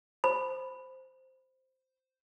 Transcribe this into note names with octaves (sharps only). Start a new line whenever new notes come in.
C5 B5